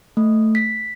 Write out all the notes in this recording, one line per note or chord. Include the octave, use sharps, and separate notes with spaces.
A3
B6